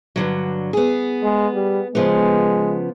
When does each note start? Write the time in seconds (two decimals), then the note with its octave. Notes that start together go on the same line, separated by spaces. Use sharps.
0.16 G2 D3 F#3
0.73 B3 G#4
1.23 G#3
1.54 G3
1.95 C#3 F3 G#3 B3